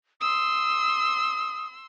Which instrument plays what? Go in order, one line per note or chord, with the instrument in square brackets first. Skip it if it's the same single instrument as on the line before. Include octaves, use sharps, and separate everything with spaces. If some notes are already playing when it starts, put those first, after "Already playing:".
[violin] C6 E6 [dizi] D#6